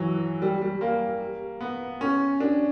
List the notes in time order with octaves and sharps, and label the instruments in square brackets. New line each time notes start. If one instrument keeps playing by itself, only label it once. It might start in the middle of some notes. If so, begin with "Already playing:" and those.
Already playing: [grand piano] E3 F#3
G3
G3
A#3
B3
C#4
D4